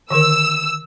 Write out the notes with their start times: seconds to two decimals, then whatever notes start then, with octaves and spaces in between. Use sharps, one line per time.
0.10 D3 D#3 A#4 E6